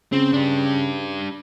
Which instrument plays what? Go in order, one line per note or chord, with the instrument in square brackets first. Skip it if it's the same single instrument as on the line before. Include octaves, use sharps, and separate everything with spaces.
[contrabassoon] C#3 [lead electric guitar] C4
[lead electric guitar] D4 G4